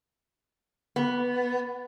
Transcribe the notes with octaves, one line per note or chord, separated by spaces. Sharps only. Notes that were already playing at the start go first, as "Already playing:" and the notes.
B3